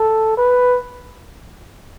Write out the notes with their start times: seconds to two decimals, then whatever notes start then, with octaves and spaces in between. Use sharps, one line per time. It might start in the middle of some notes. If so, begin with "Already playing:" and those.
Already playing: A4
0.37 B4